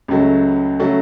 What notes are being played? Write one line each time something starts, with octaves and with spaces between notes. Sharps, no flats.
C#2 C#3 F#3 A3
C#3 F#3 A3